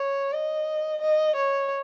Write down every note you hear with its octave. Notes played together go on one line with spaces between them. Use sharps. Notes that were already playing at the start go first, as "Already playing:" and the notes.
Already playing: C#5
D#5
D#5
C#5